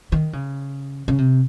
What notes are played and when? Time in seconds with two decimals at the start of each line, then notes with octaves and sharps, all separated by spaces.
0.12 D#3
0.33 C#3
1.08 C#3
1.18 C3